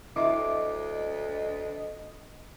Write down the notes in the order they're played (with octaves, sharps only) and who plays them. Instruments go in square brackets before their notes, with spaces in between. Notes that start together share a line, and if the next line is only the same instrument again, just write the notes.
[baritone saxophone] D2 [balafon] E4 E5 [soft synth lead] D#5 [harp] D6